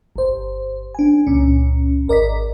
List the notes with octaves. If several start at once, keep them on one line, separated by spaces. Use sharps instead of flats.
G1 C5
D4 G#5
C#2 A#2 C#4
G#1 A#4 D5 D#5 B6